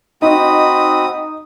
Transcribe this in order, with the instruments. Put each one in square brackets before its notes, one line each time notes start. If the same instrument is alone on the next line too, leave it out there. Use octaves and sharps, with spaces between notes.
[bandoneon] C4 F#4 B5 [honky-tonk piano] D#4 [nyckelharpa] D#6